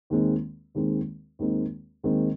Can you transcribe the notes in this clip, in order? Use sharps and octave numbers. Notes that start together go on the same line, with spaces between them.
D#2 D#3 G#3 C4
D#2 D#3 G#3 C4
D#2 D#3 G#3 C4
D#2 D#3 G#3 C4